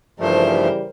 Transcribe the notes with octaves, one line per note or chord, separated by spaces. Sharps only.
G2 C#3 E3 F3 G3 A3 A#4 C5